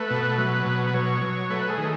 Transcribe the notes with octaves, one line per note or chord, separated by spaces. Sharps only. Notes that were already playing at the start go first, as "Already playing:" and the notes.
Already playing: A3 B4
B2
F#3
B2
B4
F#3 C#5
F#3
A3 B4
G#4
D#3